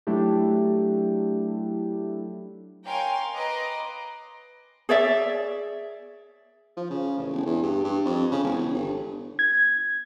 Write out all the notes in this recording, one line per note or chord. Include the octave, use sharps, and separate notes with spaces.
F#3 A3 D4 E4 G4
A#4 C#5 F5 G5 G#5 C6
B4 D#5 A#5 C6 D6
G#4 C#5 D5 E5
F3
C#3
A1
E1
E2
G2
G2
F2
C#3
E1
G1
G#6